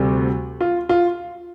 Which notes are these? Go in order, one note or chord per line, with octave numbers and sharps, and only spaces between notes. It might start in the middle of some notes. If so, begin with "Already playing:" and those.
Already playing: D2 C3 G3
F4
F4